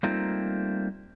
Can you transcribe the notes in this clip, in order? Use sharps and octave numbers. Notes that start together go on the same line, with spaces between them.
G3 A3 A#3 C4 D#4 F4